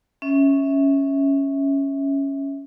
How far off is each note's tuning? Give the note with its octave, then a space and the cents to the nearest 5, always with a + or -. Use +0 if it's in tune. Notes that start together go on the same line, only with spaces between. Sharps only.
C#4 +0 E5 -15